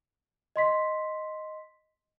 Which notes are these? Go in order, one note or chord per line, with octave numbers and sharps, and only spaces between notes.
D#5 C6 B6